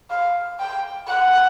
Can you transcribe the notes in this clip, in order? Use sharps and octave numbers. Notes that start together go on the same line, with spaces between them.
F5
G5
F#5